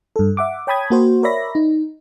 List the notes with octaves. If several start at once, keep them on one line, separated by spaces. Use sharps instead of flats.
G2 A4
E5 F#5 D6
C#5 G5 A5 B5 D#6 G#6
A#3 F#4 C5
A#4 C#5 D5 E5 B5 A#6
D#4